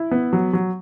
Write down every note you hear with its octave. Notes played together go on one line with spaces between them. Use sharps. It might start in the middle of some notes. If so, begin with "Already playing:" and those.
Already playing: E4
B3
F#3
F#3